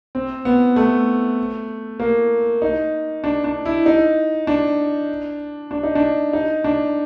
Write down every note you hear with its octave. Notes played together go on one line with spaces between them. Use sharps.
C4
B3
A3
A#3
D#4
D4
D4
E4
D#4
D4
D4
D#4
D4
D#4
D4